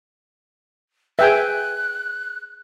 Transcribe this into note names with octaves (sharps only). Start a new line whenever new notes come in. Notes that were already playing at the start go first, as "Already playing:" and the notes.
G#4 B4 E5 G5 G#5 F#6